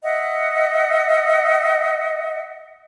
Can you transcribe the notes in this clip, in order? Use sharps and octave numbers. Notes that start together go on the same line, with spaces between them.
D#5 E5 F#5